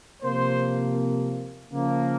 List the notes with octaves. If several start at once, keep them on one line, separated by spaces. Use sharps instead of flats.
C3 F3 A#3 C5
C#3 F3 A#3